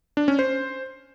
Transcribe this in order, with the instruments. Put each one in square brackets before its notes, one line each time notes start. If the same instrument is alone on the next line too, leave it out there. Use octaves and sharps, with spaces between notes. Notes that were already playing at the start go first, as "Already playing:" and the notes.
[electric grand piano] D4
C#4
C5